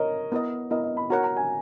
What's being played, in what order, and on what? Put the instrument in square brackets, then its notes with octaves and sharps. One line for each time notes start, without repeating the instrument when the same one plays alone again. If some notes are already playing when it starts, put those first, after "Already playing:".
Already playing: [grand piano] A#4 C#5 D#5
[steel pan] B3 E4 A#4 D#5
[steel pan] B3 E4 A#4 [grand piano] D#5
[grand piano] D#5
B5
[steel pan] F#4 A#4 C#5 F#5 [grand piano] A#5
[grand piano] A#5
G#5